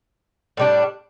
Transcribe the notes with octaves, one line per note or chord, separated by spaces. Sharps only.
A2 G3 D4